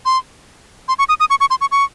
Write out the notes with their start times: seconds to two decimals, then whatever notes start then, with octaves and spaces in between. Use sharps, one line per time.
0.06 C6
0.88 C6
0.99 C#6
1.09 D#6
1.20 D#6
1.30 C#6
1.40 C#6
1.50 C6
1.61 C#6
1.72 C#6